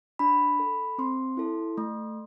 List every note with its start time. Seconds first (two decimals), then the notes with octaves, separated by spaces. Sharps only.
0.19 D4 B5
0.60 A4
0.98 C4 C6
1.37 E4 A4
1.78 A3